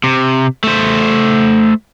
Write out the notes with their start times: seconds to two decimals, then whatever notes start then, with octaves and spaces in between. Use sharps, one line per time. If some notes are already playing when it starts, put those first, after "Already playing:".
0.04 C3
0.64 A3 C5